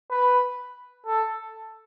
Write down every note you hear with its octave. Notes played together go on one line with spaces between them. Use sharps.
B4
A4